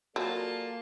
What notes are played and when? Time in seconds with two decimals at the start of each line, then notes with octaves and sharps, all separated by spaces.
0.16 F#3 A#3 F4 G#4 A4 D5 A5